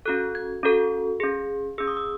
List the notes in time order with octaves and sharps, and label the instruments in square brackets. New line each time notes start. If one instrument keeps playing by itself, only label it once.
[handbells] C#4 F#4 A4 F#6
G#6
C#4 F#4 A4
C#4 G#4
C#4 G#4 E6
D#6
E6